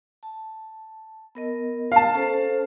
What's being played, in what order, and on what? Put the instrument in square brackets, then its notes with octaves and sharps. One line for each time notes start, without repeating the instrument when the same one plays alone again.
[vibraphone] A5
B3 A#4 D#5
[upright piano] F5 A5
[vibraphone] C#4 A4 C5